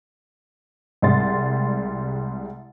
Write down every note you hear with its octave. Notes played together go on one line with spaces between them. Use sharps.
C2 G3 G#3 C6 A6